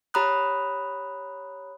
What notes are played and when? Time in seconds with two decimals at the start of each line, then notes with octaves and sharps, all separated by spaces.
0.14 G4 C#5 A#5 B5 D#6 F#6